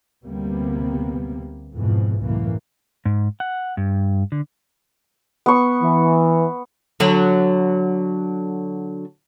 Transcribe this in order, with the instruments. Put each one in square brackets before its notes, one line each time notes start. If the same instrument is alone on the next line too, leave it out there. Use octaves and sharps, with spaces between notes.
[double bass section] D2 C3 G3 A#3 B3
F2 G#2 B2 E3 F3
C#2 F#2 A2 E3 A#3
[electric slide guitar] G#2
F#5
G2
D3
[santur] B3 C#6
[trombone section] E3
[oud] D3 F#3